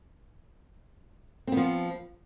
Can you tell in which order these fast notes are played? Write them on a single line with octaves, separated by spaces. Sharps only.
C4 B3 F3